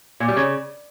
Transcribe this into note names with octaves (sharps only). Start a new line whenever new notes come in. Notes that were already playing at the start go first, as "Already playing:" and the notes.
A#2
G3
C#3